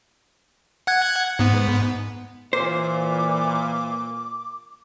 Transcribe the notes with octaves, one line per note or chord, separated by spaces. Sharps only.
F#5 F#6 G#6
G#2 B3
A#2 E3 C5 D6